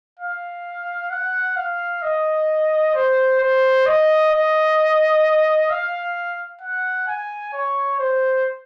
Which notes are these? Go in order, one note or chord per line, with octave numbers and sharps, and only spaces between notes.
F5
F#5
F5
D#5
C5
C5
D#5
D#5
F5
F#5
G#5
C#5
C5